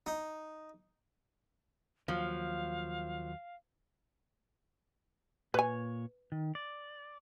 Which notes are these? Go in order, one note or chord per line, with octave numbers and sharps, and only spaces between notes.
D#4
D#2 F3 F#3 F5
A#2 B4 C#5 G#5
D#3
D5